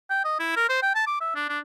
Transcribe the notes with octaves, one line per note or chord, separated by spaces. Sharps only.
G5
D#5
E4
A#4
C5
G5
A5
D6
E5
D4
D4